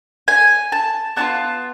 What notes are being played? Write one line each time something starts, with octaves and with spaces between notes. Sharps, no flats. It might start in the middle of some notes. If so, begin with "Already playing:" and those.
G#5
A5
B3 D4 F4 A5